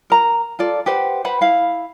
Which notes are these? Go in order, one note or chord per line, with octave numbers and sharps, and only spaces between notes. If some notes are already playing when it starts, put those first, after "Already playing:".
A#4 A#5
F4 A4 D5
G4 B4 C5 F#5
B4 C5 F#5 B5
E4 F5